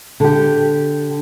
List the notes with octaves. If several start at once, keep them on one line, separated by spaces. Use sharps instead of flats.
D3 G4